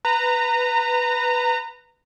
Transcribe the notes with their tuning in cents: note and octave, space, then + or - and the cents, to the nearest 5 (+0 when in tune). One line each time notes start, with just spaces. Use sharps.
B4 +0 A#5 -25